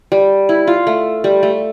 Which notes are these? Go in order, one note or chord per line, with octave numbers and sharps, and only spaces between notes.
G3
E4
F4
A3
G3
A3